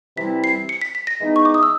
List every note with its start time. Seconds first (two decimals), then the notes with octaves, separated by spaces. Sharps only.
0.17 C3 E3 G3 C4 E4 B6
0.44 C7
0.69 C#7
0.82 B6
0.95 B6
1.07 A#6
1.21 E3 G#3 B3 D#4
1.36 C#6
1.45 D6
1.54 D#6
1.63 E6